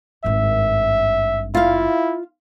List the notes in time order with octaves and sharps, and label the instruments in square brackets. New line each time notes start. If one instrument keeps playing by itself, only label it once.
[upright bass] G#1 G2 [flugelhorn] E5
[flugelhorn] E4 [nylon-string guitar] F4 F5